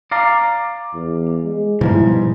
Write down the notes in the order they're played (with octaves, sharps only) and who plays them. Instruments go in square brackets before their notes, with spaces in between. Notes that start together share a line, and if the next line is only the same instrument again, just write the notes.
[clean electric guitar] D5 F5 A#5
[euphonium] E2
G#3
[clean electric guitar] G#2 [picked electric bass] B2 F3 G3 [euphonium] E4